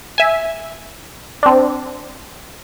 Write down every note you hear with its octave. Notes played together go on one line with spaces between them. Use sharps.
E5 G#5
C4 D4